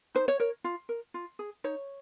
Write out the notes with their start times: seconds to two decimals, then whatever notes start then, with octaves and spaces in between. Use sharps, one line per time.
0.15 D#4 C5
0.28 C#5
0.40 A#4 C#5
0.64 F4
0.89 A#4
1.14 F4
1.39 G#4
1.64 D#4 C#5